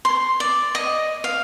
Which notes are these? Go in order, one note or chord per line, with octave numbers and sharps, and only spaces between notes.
C6
D5
D#5
F5